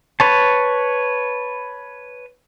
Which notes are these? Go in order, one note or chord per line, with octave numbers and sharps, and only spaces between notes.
B4 C#5 A5